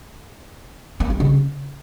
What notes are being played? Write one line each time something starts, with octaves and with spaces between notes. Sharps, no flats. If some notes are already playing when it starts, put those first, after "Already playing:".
A#3
G#3
C#3